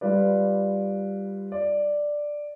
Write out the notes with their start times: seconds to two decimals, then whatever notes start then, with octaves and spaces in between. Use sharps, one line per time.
0.01 G3 F4 B4 D5
1.52 D5